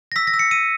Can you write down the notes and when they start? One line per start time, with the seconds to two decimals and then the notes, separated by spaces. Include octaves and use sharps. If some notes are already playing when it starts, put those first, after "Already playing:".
0.12 A#6
0.16 E6 B6
0.27 A#6
0.34 E6
0.39 C#7
0.51 E6 D#7